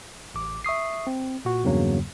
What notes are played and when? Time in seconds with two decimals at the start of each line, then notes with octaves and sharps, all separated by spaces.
0.34 A1 D6
0.64 E5 C#6 D#6 C7
1.07 C4
1.45 A#2 F#4
1.64 E2 G2 C#3 F#3 A#3